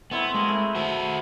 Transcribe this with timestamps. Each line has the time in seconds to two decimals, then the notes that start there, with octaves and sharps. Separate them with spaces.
0.11 A3 B3 C4 E4
0.34 G#3 A#3 G#4
0.48 A3 B4
0.75 F#4 C5